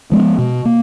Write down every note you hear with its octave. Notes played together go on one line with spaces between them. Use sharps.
F3 G#3 B3
B2
A#3